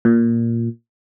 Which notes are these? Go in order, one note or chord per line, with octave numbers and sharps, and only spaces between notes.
A#2